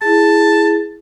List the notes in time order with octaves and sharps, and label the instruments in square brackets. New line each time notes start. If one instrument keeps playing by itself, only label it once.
[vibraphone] E4 G#4 [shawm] A5